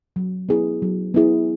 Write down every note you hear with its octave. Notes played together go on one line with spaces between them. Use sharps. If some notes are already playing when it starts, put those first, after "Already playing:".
F#3
B3 E4 G#4
F#3
B3 E4 G#4